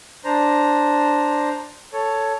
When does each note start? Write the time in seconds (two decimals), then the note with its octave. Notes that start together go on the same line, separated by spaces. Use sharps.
0.25 D4 C5 A#5
1.93 A4 C#5